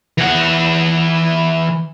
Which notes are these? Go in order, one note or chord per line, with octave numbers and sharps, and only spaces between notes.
E3 F#5